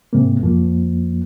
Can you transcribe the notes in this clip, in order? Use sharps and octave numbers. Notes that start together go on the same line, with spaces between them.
G#2 C3 G#3 A#3
F2 F3 A#3